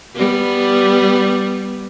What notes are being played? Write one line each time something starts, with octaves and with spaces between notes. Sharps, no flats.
G3 B3